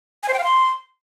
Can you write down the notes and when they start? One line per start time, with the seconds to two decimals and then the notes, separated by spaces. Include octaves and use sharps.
0.23 G#5
0.28 C5
0.33 G5
0.39 F5
0.44 C6